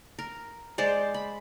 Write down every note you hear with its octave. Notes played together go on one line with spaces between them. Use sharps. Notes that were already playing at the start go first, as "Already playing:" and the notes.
A#4
G#3 C5 D5
B5